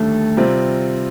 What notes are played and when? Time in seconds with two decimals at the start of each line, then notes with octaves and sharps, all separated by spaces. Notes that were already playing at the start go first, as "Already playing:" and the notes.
Already playing: D#2 D3 G3 A3 A4
0.37 C3 G3 C4 F4